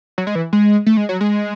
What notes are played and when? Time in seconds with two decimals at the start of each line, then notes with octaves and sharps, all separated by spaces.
0.18 F#3
0.27 G#3
0.35 E3
0.53 G#3
0.86 A3
0.97 G#3
1.09 F#3
1.21 G#3